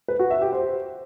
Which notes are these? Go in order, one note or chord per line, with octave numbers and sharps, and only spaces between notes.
B4
F#4
E5
G4
C5